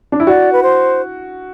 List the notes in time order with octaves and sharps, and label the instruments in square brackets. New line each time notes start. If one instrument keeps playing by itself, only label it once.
[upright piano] D4
E4
[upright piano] F#4 [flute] D5
[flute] B4
C5